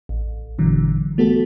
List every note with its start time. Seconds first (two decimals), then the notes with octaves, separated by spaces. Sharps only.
0.09 A1
0.58 G#1 A#2 D3 E3 F#3
1.18 A3 B3 F#4 G4 A4